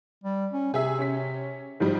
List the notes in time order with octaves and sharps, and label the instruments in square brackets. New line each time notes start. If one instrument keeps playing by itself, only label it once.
[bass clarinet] G3
C#4
[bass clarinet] C3 [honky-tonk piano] G#4 E5
[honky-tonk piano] C#4 B6
G#2 F3 G3